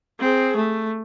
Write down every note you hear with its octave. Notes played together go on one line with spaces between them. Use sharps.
C4 G#4
A3